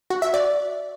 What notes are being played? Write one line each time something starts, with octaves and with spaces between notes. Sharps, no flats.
F#4
E5
D5